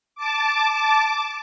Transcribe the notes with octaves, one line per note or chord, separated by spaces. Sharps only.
A5 D6